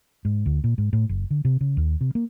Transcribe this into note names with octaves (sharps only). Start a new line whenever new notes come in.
G#2
D2
A#2
G#2
A2
F#1
D3
C3
C#3
D#2
C3
A#3